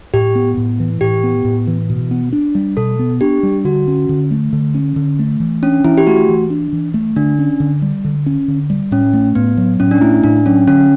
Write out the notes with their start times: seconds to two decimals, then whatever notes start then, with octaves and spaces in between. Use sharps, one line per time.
0.14 A2 G4
0.35 B3
0.57 A2
0.80 E3
1.01 A2 G4
1.23 B3
1.45 A2
1.67 E3
1.90 B2
2.11 B3
2.33 D4
2.55 G3
2.77 B2 A4
2.99 B3
3.21 D4 G4
3.43 G3
3.65 D3 F#4
3.87 C#4
4.09 D3
4.31 A3
4.53 D3
4.74 C#4
4.96 D3
5.19 A3
5.40 E3
5.62 C#4 D4
5.84 E3 E4
5.98 G4
6.07 A3 F#4
6.29 E3
6.50 D4
6.73 E3
6.94 A3
7.16 D3 D4
7.39 C#4
7.60 D3
7.82 G3
8.04 D3
8.26 C#4
8.48 D3
8.70 G3
8.91 A2 C#4
9.13 A3
9.35 A2 B3
9.58 F#3
9.80 A2 C#4
9.91 D4
10.01 A3 E4
10.24 A2 D4
10.45 F#3 C#4
10.67 D3 C#4